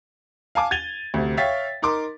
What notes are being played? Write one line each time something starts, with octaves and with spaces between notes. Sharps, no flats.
F5 G#5 A5 D6
G#6 A6 D#7 F7 G7
D2 C3
C#5 E5 F5 G5 A6 B6
D#4 A#4 C6 D6